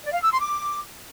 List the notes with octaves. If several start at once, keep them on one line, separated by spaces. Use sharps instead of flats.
D5
F5
E6
C6
D6